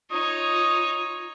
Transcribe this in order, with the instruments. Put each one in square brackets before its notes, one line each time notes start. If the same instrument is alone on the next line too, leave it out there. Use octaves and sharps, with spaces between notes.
[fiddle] D#4 C#5 [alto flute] F4 [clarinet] D#6